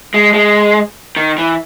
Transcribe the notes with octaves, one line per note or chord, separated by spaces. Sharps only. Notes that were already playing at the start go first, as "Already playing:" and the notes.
G#3
G#3
D#3
E3